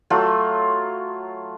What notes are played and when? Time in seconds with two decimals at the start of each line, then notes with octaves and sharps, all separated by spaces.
0.10 F#3 A3 F4